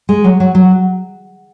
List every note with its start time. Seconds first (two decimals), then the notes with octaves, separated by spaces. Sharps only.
0.09 G#3
0.24 F#3
0.40 F#3
0.55 F#3